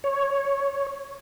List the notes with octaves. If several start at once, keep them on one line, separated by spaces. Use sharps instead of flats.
C#5